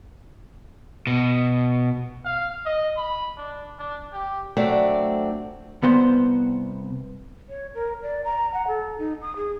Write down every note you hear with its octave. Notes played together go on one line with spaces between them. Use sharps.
B2
F5
D#5
B5
D4
D4
G4
F#3 A3 C4 D4 D5
C2 B3 C5
C#5
A#4
D5
A#5
F#5
A4
D#4
D#6
G#4